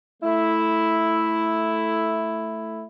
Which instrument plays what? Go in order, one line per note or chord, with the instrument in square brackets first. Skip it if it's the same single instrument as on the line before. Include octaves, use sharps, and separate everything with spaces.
[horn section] A3 E4